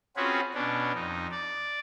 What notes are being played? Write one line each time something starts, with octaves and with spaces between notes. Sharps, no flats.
C4 C#4 F4 F#4 G#4 B4
B2 C#4 D4
F2 D#4
D5